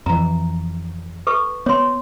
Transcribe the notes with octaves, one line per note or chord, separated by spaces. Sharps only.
F2 E3 A#5
A4 B4 C#6
B3 C#5 C6